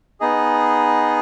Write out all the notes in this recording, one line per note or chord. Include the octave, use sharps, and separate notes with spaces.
B3 D#4 G#4 D#5